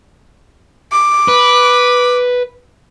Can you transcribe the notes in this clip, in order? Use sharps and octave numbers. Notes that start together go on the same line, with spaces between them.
D6
B4